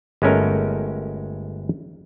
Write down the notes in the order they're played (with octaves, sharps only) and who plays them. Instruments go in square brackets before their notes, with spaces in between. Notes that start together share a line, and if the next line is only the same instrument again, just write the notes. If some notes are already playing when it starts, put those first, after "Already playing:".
[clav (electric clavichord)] G1 G#3 A3 C#4 A#4